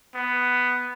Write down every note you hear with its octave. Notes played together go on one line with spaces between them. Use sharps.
B3